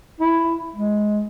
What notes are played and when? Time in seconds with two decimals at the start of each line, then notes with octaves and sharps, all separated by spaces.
0.20 E4
0.76 G#3